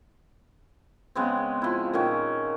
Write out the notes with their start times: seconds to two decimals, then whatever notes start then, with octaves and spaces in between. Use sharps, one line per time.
1.15 C#3 G#3 B3 C4
1.62 F3 E4
1.93 A#2 D#3 C#4